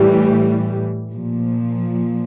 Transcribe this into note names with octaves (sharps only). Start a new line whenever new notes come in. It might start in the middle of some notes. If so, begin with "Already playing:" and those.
Already playing: A2 E3 G3
A#2 F3